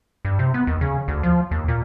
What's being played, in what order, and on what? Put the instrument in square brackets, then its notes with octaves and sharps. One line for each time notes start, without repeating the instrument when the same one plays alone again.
[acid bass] G2
C3
B3
D#2
C#3
D2
F3
D#2
A#2